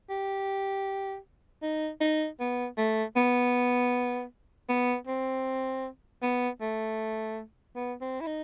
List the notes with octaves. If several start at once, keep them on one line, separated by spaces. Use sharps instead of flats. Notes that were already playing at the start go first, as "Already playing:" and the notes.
G4
D#4
D#4
B3
A3
B3
B3
C4
B3
A3
B3
C4
E4
D#4